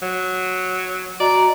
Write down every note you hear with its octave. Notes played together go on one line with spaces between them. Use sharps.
F#3
F#4 D5 D#5 A#5